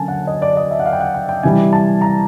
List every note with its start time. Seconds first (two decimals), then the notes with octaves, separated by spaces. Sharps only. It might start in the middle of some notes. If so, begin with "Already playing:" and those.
Already playing: D3 F#3 A#3 C#4 G#5 A5
0.08 F#5
0.27 D#5
0.42 D5
0.57 D#5
0.71 E5
0.79 F#5
0.85 F5
0.93 G5
1.00 F#5
1.14 G5
1.29 G5
1.43 C3 E3 G3 G#5
1.73 A5
2.01 A#5